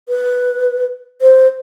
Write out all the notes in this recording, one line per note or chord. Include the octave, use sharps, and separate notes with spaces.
B4
C5